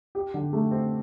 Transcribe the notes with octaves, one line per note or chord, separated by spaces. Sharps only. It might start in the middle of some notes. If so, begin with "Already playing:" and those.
G4
D3
A3
C4